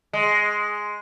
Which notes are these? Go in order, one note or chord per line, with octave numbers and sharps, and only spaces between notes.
G#3